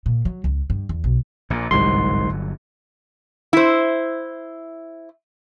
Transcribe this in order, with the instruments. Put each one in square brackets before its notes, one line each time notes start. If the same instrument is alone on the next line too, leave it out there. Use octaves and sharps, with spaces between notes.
[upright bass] A#2
F#3
C#2
G2
E2
B1
[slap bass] A#1 A#2
[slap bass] G1 F#3 [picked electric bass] C2 G#2 [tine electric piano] C6
[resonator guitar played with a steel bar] E4 C5